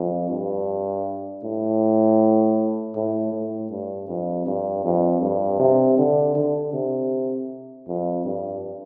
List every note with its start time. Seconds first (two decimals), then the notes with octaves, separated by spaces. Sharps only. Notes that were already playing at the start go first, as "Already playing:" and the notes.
Already playing: F2
0.30 G2
1.43 A2
2.95 A2
3.33 A2
3.70 G2
4.08 F2
4.46 G2
4.85 F2
5.22 G2
5.59 C3
5.98 D3
6.35 D3
6.73 C3
7.87 F2
8.25 G2